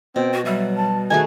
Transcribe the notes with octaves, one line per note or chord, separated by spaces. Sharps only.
B2 C4 G5
F#4
F#3 G3 E5
A5
D#3 A3 F#4 G#4 G#5